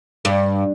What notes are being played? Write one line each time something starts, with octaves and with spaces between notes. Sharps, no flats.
G2